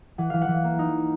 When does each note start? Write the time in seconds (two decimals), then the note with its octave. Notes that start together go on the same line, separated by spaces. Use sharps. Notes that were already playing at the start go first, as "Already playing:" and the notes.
0.18 E3 F#5
0.30 E3 F5
0.42 F#5
0.48 E3
0.64 A#3
0.79 D#4